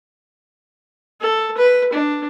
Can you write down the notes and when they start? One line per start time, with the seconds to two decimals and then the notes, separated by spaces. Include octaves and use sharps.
1.22 A4
1.57 B4
1.93 D4